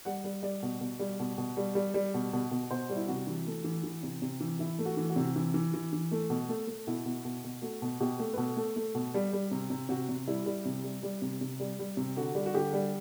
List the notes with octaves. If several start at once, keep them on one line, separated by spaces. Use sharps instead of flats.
G3 F#5
G3
G3 D5
B2
B2
G3
B2
B2
G3
G3
G3
B2
B2
B2
B2 C5
G3
E4
C3 F#4
E3
A3
E3
E3
C3
C3
E3
E3 E4
A3
F#4
E3
F#4
C3
E3
E3
E3
E3
A3
B2
A3
A3
B2 E4
B2
B2
B2
A3 F#4
B2
B2 G4
A3
B4
B2 A4
A3
A3
B2
G3
G3
C3
C3
C3 F#4
C3
G3 E4
G3
C3
G3
G3
C3
C3
G3
G3
C3
D3 F#4
G3
F#4
D3 G4
G3